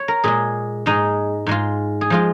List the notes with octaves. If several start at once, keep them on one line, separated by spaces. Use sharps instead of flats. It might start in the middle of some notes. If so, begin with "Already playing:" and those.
Already playing: C#5
A#4
A#2 G#3 G#4
G#2 G#3 D#4
G#2 G#3 F4
G#4
F3 G#3 F4